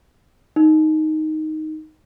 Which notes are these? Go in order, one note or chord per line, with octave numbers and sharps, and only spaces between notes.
D#4